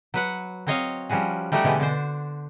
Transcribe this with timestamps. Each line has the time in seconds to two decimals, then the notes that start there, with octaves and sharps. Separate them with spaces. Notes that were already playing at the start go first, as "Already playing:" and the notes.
0.14 F#3 B4 F#5
0.67 F#3 C4 C#5 D#5 F5
1.09 F3 G3 C#4 F#4 G#4
1.52 G3 A3 D#4 F#4 G4
1.64 B2 D3 E3 G#3
1.80 D3 D4 C5